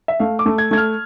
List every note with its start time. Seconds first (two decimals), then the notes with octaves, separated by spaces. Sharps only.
0.08 E5
0.20 A3 F5
0.39 D6
0.46 A3
0.58 G#6
0.71 A3 G#6
0.77 F6